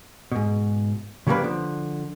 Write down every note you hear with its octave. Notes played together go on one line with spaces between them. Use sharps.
G#2 B2
C#3 F#3 G3 A3 A#3 B4
D3 F3